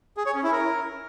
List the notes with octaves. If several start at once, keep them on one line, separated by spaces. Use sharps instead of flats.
G#4
C#5
C#4
E4
A#4